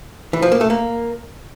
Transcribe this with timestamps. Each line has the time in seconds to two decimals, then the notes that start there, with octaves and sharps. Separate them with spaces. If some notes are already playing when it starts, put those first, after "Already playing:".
0.33 E3
0.42 F3
0.52 A#3
0.61 A3
0.70 A#3